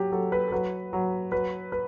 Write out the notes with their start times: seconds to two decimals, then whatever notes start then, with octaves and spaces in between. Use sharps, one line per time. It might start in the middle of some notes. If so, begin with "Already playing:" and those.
Already playing: F#3 G4
0.12 F#3 A4
0.32 B4
0.48 A4
0.52 F#3 B4
0.93 F#3
1.32 F#3 B4
1.72 B4